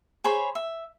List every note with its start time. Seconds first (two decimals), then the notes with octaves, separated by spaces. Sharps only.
0.24 G#4 C5 C#5 B5
0.55 E5